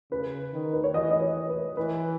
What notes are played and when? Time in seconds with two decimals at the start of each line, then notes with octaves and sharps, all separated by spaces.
0.11 C#3 B4
0.53 D#3
0.73 B4
0.84 C#5
0.94 E3 D#5
1.10 D#5
1.22 C#5
1.49 B4
1.77 E3 B4